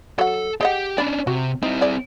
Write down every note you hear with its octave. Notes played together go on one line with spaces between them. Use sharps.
F#3 A4 F#5
G4 G#4 D#5 F#5 G5
C#4 D4 D5 B5
C3 F#4
C4 D#4 E4
G#4 D5